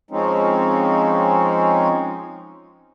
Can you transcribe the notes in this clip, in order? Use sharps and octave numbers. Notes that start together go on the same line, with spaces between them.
F3 G#3 C4 C#4 D#4